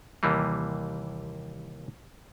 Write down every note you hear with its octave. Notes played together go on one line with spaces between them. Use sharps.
D#2 C3 E3 G3 A#3